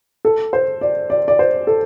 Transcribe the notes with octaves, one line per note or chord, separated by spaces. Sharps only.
A4
C5
D5
D5
D5
C5
A4